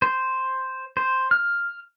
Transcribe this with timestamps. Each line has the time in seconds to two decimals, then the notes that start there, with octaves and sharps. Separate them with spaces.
0.02 C5
0.97 C5
1.31 F6